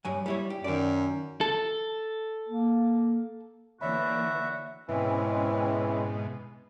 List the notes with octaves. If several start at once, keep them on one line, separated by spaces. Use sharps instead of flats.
G2 F#3 G#5
G3 E4 C#5
G4
F#2 D#3 D5
A4
A#3
D3 E3 A#3 F#4 C#5 D5 E5 B5
G#2 B2 E3 G#3 C4 C#4